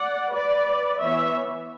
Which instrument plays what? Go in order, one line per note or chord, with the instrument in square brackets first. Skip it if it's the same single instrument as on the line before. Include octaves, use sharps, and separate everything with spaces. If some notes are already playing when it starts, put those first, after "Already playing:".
Already playing: [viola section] D5 F#5
B4 D5
E3 B3 C#5 E5